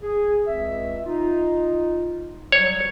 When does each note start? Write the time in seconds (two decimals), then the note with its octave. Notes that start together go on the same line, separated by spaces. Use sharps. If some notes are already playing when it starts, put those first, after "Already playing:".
0.03 G#4
0.46 C#2 C4 E5
1.05 D#4 F4
2.52 F#3 G3 C#5